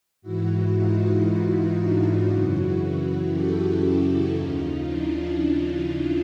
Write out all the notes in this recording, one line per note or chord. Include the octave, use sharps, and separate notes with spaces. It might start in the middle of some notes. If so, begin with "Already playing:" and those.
G#2 E3 E4 F#4
D#4 F4
D4 E4
F#2 C#3 E3 E4 F#4
G4 A4
E4 F#4
D#2 C#3 F3 D#4 F4
D4 E4
D#4 F4